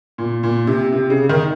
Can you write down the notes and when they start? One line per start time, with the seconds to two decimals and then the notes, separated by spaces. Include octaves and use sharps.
0.18 A#2
0.43 A#2
0.67 C3
0.92 C3
1.10 C#3
1.29 D#3